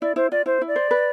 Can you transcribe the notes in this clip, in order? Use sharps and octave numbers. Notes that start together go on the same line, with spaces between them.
E4 D5
E4 C5
F4 D5
E4 C5
E4
D5
C5
B4